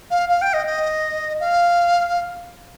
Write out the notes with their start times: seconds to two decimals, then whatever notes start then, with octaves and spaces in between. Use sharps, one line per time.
0.11 F5
0.29 F5
0.42 G5
0.54 D#5
0.67 D#5
1.40 F5